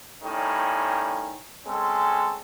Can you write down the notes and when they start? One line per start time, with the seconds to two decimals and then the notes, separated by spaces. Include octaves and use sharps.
0.23 A2 D#3 G3 C#4
1.66 G#3 C4 C#4 A4